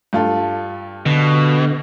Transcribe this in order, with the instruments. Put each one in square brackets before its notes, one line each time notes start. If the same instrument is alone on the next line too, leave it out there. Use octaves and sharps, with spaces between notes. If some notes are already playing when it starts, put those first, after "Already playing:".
[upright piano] G2 F4 A4
[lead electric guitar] B2 [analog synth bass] D3